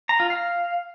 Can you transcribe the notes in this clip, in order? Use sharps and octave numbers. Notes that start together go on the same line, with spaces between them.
A#5
F4
F5